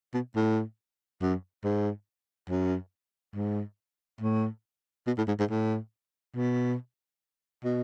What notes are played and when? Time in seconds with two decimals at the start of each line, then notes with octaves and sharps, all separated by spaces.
0.14 B2
0.35 A2
1.21 F#2
1.64 G#2
2.49 F#2
3.35 G#2
4.21 A2
5.07 B2
5.18 A2
5.28 G#2
5.39 G#2
5.50 A2
6.36 B2
7.64 B2